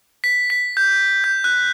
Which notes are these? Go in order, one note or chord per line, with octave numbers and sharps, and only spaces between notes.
B6
B6
G6
G6
F#6